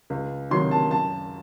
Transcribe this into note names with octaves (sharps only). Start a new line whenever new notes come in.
C#2
C3 D#3 F#3 C6
A5
F#2 A5